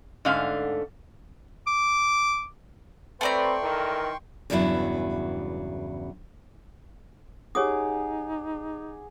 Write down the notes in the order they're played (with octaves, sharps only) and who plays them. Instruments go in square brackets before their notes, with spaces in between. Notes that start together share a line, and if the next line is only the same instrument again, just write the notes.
[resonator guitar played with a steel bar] G#2 D3 A3 C#4 F5
[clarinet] D6
[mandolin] A3 D5 A#5 [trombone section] C4 B4 [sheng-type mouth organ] G5 C6 C#6
[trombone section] D#3 E3 A#4
[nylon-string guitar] E2 G2 C#3 F#3 B3 E4
[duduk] D#4 [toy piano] G4 C#5 D#6 [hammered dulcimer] G#4 F#5 D6